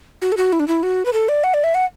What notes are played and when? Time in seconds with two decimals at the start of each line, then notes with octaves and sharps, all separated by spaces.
0.22 F#4
0.32 A4
0.37 F#4
0.52 E4
0.60 D4
0.68 E4
0.83 F#4
1.05 B4
1.13 A4
1.29 D5
1.44 F#5
1.54 D5
1.64 E5
1.74 F#5